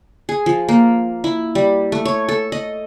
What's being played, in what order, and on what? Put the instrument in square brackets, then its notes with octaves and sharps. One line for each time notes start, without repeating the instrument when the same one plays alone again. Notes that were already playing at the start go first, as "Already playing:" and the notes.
[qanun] G#4
F3
A#3
E4
G3
A3
C#5
A4
D#5